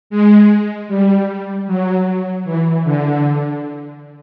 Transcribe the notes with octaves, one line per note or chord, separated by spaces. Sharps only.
G#3
G3
F#3
E3
D3